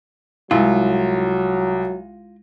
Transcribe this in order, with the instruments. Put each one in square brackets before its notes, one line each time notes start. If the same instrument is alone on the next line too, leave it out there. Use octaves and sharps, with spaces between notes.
[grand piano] C2 [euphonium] F#3 [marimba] G#3 E4 [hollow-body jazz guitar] F4